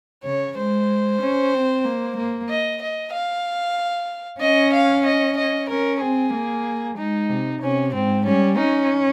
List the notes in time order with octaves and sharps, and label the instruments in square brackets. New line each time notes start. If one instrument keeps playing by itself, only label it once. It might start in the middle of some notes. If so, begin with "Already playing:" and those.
[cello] C#3 [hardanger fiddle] C#5
[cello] G#3 [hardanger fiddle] C5
[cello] C#4
C4
A#3
A#3
[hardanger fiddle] D#5
D#5
F5
[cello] C#4 [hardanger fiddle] D#5
[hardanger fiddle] F5
D#5
D#5
[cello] C#4 [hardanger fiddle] A#4
[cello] C4 [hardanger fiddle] G#4
[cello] A#3
[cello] G#3 [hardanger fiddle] D#4
[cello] C3
[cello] C3 [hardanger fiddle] C#4
[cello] G#2 [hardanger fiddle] C4
[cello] G3 [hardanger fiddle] C#4
[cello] C#4 [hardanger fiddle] D#4